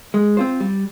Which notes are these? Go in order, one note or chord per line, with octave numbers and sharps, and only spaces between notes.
G#3
C4 F4 C5
G3